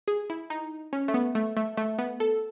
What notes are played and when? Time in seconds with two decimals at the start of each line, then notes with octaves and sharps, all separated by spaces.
0.08 G#4
0.30 E4
0.50 D#4
0.93 C#4
1.08 A3
1.14 B3
1.35 A3
1.57 A3
1.77 A3
1.98 B3
2.20 A4